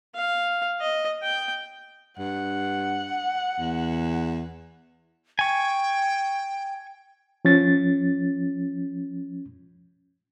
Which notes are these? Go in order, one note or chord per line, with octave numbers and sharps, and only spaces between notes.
F5
D#5
G5
G2 F#5
E2
G5 G#5 C#6
F3 C#4 A6